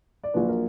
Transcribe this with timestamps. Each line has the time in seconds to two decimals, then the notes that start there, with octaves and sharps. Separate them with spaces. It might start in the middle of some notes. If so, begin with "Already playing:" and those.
0.24 D5
0.34 A#1 A#2 F#3 B4
0.48 A#4